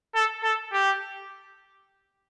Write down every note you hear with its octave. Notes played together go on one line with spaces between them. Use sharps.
A4
A4
G4